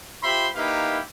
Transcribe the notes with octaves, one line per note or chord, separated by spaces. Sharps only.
F4 G4 C5 E5 B5 C6
A#3 D#4 E4 G4 B4 F5